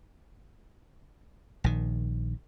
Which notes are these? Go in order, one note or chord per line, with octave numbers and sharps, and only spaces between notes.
A#1 D#3